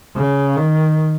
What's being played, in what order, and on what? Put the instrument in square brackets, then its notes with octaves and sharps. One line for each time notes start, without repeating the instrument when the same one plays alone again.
[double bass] C#3
D#3